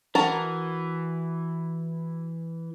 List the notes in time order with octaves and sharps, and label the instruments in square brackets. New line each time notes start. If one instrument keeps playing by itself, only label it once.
[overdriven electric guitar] E3 [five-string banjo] F#4 A#4 A5